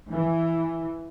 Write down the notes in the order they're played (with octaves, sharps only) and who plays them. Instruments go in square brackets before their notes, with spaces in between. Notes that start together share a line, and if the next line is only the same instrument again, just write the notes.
[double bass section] E3